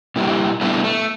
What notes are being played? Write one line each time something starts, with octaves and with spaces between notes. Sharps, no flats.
A#2 G3 A#3 E4 G4
G3 A3 B3 D4 E4
A3